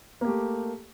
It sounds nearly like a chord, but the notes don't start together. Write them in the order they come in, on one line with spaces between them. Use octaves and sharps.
A#3 G4 A3